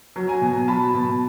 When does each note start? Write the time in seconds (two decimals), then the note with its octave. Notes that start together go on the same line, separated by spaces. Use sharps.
0.16 F#3
0.28 G#5 A#5
0.41 B2
0.68 F#3 A5 B5
0.94 B2